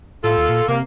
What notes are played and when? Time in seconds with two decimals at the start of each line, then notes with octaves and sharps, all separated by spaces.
0.24 A2 F4 A4
0.38 D#2
0.49 A#2
0.68 C3 A#3